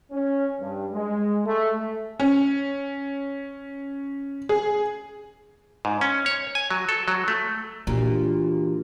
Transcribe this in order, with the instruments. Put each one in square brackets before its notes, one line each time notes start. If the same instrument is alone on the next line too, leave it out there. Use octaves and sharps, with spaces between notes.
[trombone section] C#4
G2
G#3
A3
[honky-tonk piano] C#4
G#4
[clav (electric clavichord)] G#2
C#4
C#5
G#5
F#3
A4
F#3
A3
[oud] A#2 [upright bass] E3 [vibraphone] D4 F#4 G4